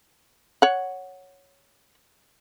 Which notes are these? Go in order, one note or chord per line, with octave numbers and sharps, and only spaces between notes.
C#5 F#5